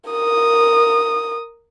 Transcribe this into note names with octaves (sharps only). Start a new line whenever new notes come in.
A#4 D#6